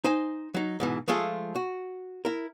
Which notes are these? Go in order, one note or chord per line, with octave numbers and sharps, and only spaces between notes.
D#4 C5 G#5
F#3 D#4
G#2 B2 E3
F3 G#3 A3 F4 G#4 A4
F#4
E4 A#4